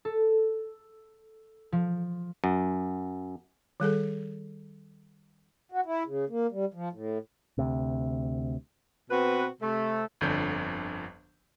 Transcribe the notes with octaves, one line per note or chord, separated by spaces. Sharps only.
A4
F3
F#2
D#3 G3 G#4 A4
F#4
E4
C#3
A#3
G3
F3
A2
D2 C3
B2 C4 F#4 B4
C3 A3
G1 F2 D3 G6